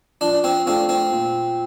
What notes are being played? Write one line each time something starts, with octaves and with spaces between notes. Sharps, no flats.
F3 D4
C4
A3 C4 D4 F4
C4
A#2